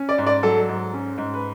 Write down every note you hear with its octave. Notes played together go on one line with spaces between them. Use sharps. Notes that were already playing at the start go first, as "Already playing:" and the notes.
Already playing: C#4
D5
G#2
D5
F#3 A4
G#2
C#4
G#2
B4